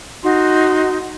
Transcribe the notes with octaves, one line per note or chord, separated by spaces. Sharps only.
D#4 F#4 C6